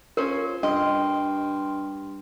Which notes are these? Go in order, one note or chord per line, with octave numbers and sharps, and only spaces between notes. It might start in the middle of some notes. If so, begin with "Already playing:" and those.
C#4 F4 A#4 C5 C#5
G2 D#5 G5 C6 F6